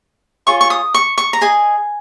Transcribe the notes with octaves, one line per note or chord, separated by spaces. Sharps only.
F4 G#4 C#5 C#6
C#6
D#6
C#6
C#6
A#5
G#4 D#5 G#5